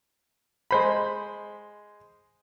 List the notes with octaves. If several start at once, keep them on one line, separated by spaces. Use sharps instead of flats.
G#3 C5 B5